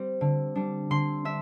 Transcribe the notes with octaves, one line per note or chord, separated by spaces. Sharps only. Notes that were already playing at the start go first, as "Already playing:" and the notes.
Already playing: G3 C4
D3
G3 D4
D3 C6
D4 E5